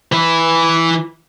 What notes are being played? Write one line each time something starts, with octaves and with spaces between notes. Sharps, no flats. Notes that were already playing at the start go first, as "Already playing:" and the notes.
E3 E4